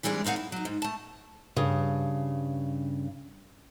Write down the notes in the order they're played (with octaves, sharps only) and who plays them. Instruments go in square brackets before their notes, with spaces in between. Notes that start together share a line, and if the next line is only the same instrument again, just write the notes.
[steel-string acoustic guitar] C3 E3 G3 G#3 D4 G#4
A#3 C4 D#4 F5 F#5
E4
F#3 D#4
G#2
A3 A5
G2 C#3